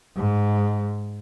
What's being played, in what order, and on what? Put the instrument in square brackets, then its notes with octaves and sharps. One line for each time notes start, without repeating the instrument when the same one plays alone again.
[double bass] G#2